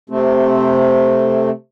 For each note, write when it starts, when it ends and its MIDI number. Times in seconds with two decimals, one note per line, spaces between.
0.10 1.50 48
0.10 1.50 57
0.10 1.50 60